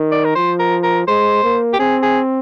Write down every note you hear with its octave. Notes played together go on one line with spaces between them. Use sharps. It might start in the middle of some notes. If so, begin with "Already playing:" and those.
Already playing: D#3
D5
A#4
F3 C5
A#4
A#4
G#3 C5
A#3
G4
C4 G#4
G#4